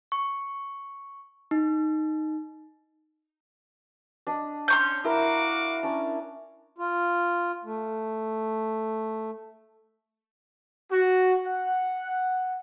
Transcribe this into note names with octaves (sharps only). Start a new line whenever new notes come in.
C#6
D#4
D4 D#5
C#4 C6 C#6 G6
E4 F#4 A#4 F5 D6 E6
C#4 D4
F4
A3
F#4
F#5